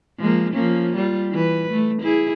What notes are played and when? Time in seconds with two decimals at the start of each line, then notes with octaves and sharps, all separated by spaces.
0.19 F3 G#3 A#3
0.54 F3 A#3 C#4
0.97 G3 F4
1.31 E3 B4
1.71 A3
2.03 E4 G#4